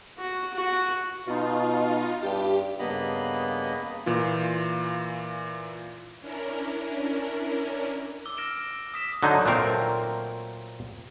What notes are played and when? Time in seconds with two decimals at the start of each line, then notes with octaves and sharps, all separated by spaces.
0.18 F#4
0.54 F#4
1.27 B2 D#4 F4
2.22 G2 G4
2.79 G2 C#3 A#3 B3 D#5 B5
4.06 A#2 E3 F4
6.20 C#4 D4 E4 A#4
8.25 D6 E6 G7
8.37 F6 A#6 D7 E7 G7
8.94 D#6 B6 E7
9.23 D3 F#3 D#4
9.46 A#2 F#3 A3 C4 A#4